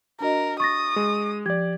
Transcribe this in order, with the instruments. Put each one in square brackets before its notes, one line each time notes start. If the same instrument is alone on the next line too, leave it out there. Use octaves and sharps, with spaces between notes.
[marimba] D4 F#4 D#5 [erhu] A#4
[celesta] C#6 A6 A#6 [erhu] D#6
[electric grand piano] G#3
[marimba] F3 [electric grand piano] G4 D5 [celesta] G#6